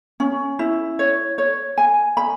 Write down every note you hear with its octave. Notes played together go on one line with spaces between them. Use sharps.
C#4
E4
C#5
C#5
G#5
B5